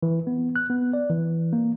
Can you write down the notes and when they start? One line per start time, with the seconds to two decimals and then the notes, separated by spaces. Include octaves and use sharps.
0.03 E3
0.27 B3
0.56 F#6
0.70 B3
0.93 D5
1.10 E3
1.53 A#3